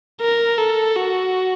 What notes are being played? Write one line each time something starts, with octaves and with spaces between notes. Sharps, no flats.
A#4
A4
F#4